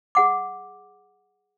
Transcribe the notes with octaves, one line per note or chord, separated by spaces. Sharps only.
G#4 F#5 D6